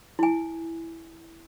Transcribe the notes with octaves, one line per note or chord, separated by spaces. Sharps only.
E4 G#5